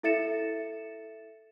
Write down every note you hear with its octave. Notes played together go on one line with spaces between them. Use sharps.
E4 A4 E5 A6 C#7 E7